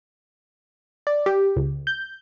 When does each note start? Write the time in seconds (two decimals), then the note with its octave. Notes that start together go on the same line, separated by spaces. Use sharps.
1.07 D5
1.26 G4
1.56 C#2
1.87 G6